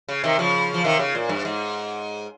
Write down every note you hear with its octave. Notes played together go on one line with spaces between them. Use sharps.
C#3
C3 D#3
C#3 F3
F3
C3 D#3
C#3
A#2
G2
G#2